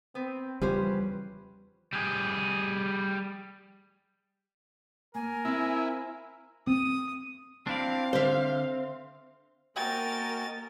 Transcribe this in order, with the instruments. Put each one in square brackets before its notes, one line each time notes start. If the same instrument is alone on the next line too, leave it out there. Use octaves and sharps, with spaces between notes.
[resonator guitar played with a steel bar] B3 [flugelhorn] C4
[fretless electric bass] E2 C#3 F3 [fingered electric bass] G3 [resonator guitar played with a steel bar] C#4 G4 C5 [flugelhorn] B4
[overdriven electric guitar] G3 G#4
[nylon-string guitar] A#3 [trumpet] A#4 [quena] G#5
[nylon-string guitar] C4 C5 F5 [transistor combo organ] E4
[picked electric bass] C4 [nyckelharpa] D#6
[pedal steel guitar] C4 [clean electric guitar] D4 E4 D5 [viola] F5
[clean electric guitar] D3 [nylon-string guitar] C5 E5
[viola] A#3 A#4 [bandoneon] F#4 D#5 G#5 [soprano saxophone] G5 [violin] A6